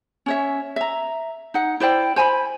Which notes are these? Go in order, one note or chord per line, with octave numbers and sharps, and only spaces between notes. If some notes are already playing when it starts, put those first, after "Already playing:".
C#4 C#5 E5
E5 A#5
D#4 F#5
E4 C5 D5 G5
C5 G#5 A5 B5